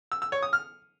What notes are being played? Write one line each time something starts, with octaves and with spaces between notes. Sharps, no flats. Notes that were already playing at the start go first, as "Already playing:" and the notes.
E6
E6
C#5
D#6
F6